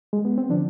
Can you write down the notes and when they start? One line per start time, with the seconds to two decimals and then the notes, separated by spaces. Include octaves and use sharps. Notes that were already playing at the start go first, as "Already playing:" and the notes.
0.13 G#3
0.25 B3
0.38 C4
0.49 D3 F3 D4